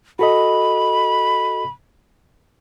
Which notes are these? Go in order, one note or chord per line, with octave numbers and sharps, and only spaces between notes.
F#4 A4 D#5 B5